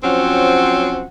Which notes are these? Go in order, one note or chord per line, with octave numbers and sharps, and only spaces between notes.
F3 F#3 C4 C#4 F#5